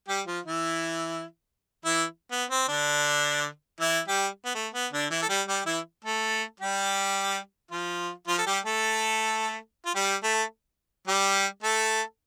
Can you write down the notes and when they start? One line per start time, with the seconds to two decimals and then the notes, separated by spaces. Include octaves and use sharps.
0.08 G3 G4
0.26 F3 F4
0.45 E3 E4
1.85 E3 E4
2.31 B3
2.50 C4
2.68 D3 D4
3.80 E3 E4
4.08 G3 G4
4.45 B3
4.55 A3
4.74 B3
4.93 D3 D4
5.10 E3 E4
5.22 A4
5.29 G3 G4
5.48 G3 G4
5.66 E3 E4
6.04 A3 A4
6.60 G3 G4
7.71 F3 F4
8.27 F3 F4
8.38 A4
8.46 G3 G4
8.65 A3 A4
9.86 F4
9.95 G3 G4
10.23 A3 A4
11.07 G3 G4
11.63 A3 A4